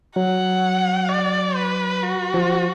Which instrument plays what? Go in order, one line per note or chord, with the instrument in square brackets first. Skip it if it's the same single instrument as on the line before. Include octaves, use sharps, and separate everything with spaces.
[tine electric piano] F#3 [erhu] F#5
[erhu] D5
B4
F#4
[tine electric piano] F3